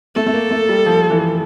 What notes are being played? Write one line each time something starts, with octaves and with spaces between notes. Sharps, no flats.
A3 A4
A3
A#3
A3
G3
F3
E3